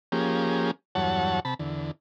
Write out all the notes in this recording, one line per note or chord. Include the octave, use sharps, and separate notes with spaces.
F3 A#3 C#4 G4 G#4
E2 G2 F#3 C#5 F#5 A5
C3 A5 B5
E2 D3